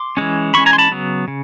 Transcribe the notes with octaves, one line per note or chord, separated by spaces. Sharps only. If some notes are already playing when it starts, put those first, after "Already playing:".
Already playing: C6 D6
E3 G#3 C#4
E3 G#3 C#4 B5 C#6
G#5 A#5
C6
A5 B5
C#3 F#3 B3
C#3